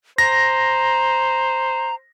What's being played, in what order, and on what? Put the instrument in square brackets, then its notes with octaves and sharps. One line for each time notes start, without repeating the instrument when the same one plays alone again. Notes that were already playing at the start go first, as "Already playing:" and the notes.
[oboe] C5 [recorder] A#5 [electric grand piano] A#6